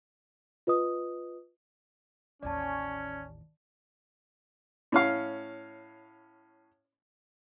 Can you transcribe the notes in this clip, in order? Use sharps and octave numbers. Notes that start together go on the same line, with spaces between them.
F4 B4 D#5 D#6
A1 D#2 C#4 D5 A5
A2 C#4 F5